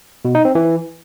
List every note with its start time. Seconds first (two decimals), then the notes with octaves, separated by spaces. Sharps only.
0.25 B2
0.35 D#4
0.45 C4
0.55 E3